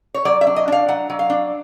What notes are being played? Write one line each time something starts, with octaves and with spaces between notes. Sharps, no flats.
C#5
F#3 D5
E5
D4
D#5
D4 F5
F#3 F#5
F#3
F5
D4